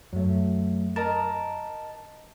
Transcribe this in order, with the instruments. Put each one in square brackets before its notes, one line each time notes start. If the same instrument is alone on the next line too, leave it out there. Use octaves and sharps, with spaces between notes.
[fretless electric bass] F#2 [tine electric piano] F#3 A3
[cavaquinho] A#4 [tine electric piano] D#5 A5